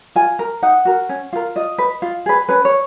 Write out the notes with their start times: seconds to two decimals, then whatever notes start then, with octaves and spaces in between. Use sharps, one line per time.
0.16 F4 G#5
0.39 A#4 A#5
0.62 D#4 F#5
0.85 F#4 A#4
1.09 C#4
1.33 F4 A#4
1.56 F4 D#5
1.78 B4
2.02 F4
2.26 G#4 B4
2.49 C#4 B4
2.65 C#5